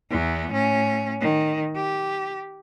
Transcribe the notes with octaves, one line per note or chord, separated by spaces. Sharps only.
E2 B3
A2 C#4
D#3
G4